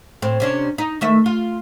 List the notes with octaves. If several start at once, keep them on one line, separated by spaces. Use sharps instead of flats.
A2 C4
C3 C#4 D4
D#4
D#3 A3 E5
F4